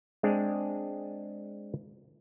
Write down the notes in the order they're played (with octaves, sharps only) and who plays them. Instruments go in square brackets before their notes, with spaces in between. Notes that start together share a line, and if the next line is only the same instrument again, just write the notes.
[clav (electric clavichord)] G#3 C4 D4 G#4